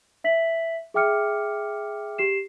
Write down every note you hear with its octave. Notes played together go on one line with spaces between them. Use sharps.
E5 B6 F#7
G#4 E5 G5 D6 F6 C#7
G4 C7 E7